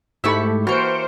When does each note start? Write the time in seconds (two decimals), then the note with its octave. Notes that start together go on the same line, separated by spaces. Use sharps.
0.24 G#2 A3 E4 G4 A4 B5 C#6 E6
0.67 E3 A#3 F#4 C5 F6 C#7 D7